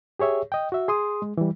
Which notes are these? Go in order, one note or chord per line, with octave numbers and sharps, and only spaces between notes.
G4 G#4 C#5 E5
D#5 G5
F#4 E5
G#4 C6 D#6
G#3
E3 G3